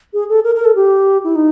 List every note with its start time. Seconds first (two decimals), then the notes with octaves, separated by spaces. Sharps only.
0.14 G#4
0.29 A4
0.44 A#4
0.55 A#4
0.65 A4
0.75 G4
1.24 E4
1.35 D#4